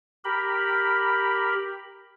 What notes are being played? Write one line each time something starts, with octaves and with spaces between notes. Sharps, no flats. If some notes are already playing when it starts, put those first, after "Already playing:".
G4 A#4 B5